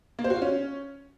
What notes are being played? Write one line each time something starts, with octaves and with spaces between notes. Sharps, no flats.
A#3
C5
F#4
F4
C#4